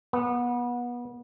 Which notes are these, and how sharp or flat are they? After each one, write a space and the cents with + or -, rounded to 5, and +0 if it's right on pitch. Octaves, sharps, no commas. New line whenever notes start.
B3 -25